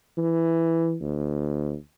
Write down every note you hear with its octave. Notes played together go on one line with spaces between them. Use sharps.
E3
D2